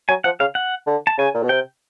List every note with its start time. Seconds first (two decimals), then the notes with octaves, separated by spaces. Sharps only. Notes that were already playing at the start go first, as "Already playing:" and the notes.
0.09 F#3 G#5
0.24 F3 F#5
0.40 C#3 F5
0.55 F#5
0.87 D3
1.07 A5
1.18 C#3 G#5
1.35 A#2
1.43 B2
1.49 C3 G5